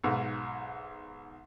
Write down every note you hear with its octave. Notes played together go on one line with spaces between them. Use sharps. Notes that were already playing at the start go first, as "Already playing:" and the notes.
B1 G#2